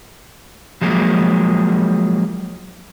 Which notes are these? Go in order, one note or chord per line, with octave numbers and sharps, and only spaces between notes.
F3 F#3 G#3 A#3